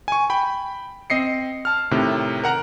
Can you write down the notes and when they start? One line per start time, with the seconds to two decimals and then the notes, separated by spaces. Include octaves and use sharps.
0.08 G#5 C#6
0.30 G5 B5
1.10 C4 D#5 C7 C#7
1.65 A5 F6
1.91 A2 C3 D#3
2.44 A#4 F#5 A#5